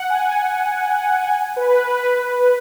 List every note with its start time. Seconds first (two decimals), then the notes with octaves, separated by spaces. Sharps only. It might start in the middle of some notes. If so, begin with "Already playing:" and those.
Already playing: F#5
0.10 G#5
1.27 G#5
1.56 B4
1.85 B4